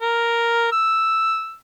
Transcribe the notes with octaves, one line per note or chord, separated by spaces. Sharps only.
A#4
E6